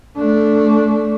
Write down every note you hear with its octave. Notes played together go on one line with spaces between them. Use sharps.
A3 D4